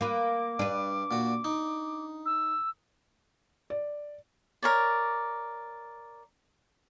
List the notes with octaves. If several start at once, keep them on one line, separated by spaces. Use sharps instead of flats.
A#3 B4 D6
G2 D4 B4
A#2 F#4
D#4
E6
D5
A#4 C#5 D5